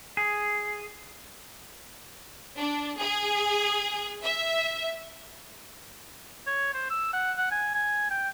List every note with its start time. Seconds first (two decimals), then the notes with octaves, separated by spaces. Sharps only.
0.17 G#4
2.57 D4
2.98 G#4
4.22 E5
6.47 C#5
6.74 C5
6.90 E6
7.13 F#5
7.38 F#5
7.51 G#5
7.75 G#5
8.10 G5